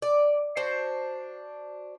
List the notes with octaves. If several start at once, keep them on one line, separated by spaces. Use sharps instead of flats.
D5
D4 F#4 C5 D5